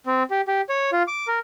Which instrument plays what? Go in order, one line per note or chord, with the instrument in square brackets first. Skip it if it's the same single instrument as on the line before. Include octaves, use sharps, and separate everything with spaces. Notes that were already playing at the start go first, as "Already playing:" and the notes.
[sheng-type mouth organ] C4
G4
G4
C#5
F4
D6
A#4